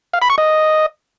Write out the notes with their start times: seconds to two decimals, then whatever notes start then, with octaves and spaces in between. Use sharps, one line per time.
0.13 F5
0.22 B5
0.30 C#6
0.38 D#5